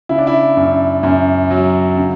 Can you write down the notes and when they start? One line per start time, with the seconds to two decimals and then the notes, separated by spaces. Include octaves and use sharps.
0.09 C#3 E4
0.18 D4
0.27 E4
0.57 F#2
1.03 F#2
1.51 F#3
1.97 C#3